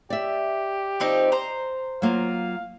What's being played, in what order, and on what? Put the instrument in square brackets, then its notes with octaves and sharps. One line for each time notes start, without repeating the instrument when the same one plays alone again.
[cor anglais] G4 [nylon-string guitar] D5 E5
[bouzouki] F3 C4 D#4
C5 A#5
[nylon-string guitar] F#3 A#3 F4 [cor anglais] F5